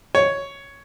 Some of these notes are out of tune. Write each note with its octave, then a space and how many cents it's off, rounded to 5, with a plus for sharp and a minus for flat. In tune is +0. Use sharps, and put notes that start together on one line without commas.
C#5 +5